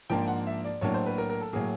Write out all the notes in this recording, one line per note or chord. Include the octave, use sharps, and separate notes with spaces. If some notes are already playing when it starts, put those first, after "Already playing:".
G#2 F3 A#3 D4 G5
F#5
E5
D5
A2 F#3 A#3 D4 C#5
C5
B4
A#4
A#4
A4
A2 F#3 A#3 G#4